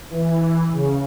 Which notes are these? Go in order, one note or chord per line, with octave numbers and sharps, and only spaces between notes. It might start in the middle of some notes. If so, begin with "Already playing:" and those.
E3
C#3